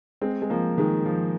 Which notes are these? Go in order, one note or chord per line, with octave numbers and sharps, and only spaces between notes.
G#3 C4
G#3
F3 A#3
D#3 G#3
F3